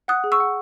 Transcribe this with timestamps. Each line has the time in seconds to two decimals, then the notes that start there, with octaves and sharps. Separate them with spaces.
0.08 F#5 D#6 F#6
0.24 G#4
0.32 C#6 E6
0.40 F#5